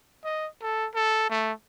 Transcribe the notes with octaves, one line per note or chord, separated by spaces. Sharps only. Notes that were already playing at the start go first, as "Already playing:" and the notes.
D#5
A4
A4
A3